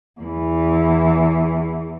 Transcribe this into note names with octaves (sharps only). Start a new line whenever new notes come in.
E2 E3